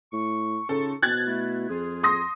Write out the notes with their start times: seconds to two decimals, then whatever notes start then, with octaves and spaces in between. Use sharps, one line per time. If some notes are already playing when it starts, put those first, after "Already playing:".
0.13 A2 C#6
0.69 C#3 D#4 F4 A4 C#6
1.02 B2 F3 F#6 G#6 A6
1.26 A3 E4
1.70 F2 F4 G#4
2.03 C6 D#6 A#6